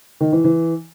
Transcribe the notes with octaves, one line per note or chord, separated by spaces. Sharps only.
D#3
E3
E3